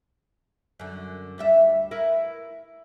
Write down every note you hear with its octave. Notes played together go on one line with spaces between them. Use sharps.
F#2 D3
D2 G3 E5
E4 A#4 B4